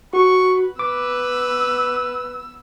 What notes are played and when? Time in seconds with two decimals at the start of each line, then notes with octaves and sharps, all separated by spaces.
0.13 F#4 B4 C#6
0.79 B3 B4 D6 E6